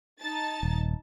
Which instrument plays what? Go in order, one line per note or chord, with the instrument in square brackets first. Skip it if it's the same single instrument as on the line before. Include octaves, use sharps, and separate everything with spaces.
[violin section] D#4 A5 A6
[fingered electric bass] D#1